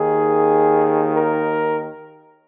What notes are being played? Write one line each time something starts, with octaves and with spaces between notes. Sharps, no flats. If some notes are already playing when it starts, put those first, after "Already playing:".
Already playing: D#2 D#3 G#4
A#4